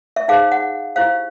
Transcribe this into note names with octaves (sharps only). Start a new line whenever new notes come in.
E5
D#4 G#4 C5 F5
F#5
E4 G4 C5 F5